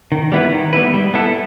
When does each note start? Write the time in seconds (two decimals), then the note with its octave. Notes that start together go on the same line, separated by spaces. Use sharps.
0.12 D#3
0.32 G3 B3 E4 B4
0.53 D#3
0.73 G3 B3 E4 B4
0.94 G3
1.14 B3 E4 A4